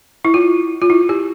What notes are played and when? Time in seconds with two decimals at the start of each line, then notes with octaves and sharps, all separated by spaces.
0.25 E4
0.34 F4
0.82 F4
0.90 E4
1.09 G4